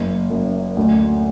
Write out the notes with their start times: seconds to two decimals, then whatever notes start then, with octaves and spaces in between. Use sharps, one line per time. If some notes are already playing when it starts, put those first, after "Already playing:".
Already playing: F#1
0.30 F#2
0.77 D2